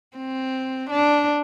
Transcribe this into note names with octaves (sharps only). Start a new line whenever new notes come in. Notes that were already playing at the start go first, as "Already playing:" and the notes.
C4
D4